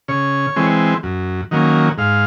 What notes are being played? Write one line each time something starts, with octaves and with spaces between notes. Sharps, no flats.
C#3 C#5
E3 G#3 C4
F#2
D#3 F#3 A#3 C#4
G#2 F5